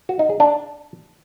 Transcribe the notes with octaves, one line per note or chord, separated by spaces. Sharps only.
F#4
D#4
G#4
D4